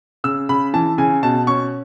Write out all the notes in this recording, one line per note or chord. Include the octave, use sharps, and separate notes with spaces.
C#3 E6
C#3 B5
E3 A5
C#3 G#5
B2 A5
C#4 C#6